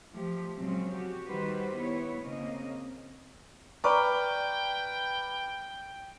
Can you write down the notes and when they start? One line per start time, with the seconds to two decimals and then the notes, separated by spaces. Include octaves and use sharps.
0.12 F3 A3 G4
0.57 A#2 C#3 F#3 G#3 C4
0.92 F#4 G4
1.26 D#3 G3 F#4 G4 B4 C5
1.76 B3 E4 C#5
2.22 C#3 A#3 C4 D#5
3.84 B4 D5 G5 A#5 C#6 D6 F6